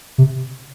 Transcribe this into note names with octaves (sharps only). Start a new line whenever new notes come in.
C3